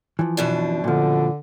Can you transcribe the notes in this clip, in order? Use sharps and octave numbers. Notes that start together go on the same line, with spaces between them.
E3 F3
F#2 B2 D4
A#2 D3 F3